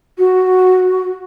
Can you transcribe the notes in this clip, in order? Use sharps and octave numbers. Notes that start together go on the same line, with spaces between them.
F#4